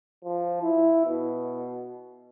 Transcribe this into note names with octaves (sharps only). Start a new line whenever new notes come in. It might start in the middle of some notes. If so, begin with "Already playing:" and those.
F3
E4
B2